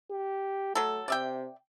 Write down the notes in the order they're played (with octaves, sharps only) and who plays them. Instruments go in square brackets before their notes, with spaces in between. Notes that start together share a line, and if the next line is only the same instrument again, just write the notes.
[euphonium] G4
[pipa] F#3 A4 [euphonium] A3
[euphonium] C3 [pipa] D5 E5 G5